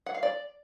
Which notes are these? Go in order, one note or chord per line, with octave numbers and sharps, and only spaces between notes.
F#5
F5
D5